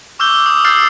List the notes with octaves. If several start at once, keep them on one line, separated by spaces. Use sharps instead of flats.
C#6 D6 E6 F6 G6 G7
D#6
E6 F6 G6 A6 C7